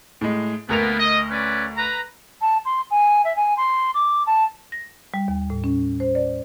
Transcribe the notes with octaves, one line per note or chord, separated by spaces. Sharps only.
A2 G#3
D2 A#3 B3 A#4 F7
D#5
C#4 B4 D5
B4 A#5
A5
C6
G#5
E5
G#5
C6
D6
A5
A#6
G3
D#2
A2
C#4
C5
D5